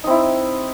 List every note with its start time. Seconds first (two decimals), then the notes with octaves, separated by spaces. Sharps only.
0.04 D#4
0.07 C4
0.10 E4